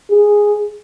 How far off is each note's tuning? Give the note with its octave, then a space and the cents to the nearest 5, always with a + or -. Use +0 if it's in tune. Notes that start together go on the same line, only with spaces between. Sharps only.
G#4 -5